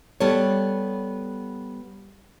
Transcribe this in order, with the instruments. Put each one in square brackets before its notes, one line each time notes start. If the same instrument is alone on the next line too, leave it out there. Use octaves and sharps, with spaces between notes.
[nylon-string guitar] G3 B3 A4 C#5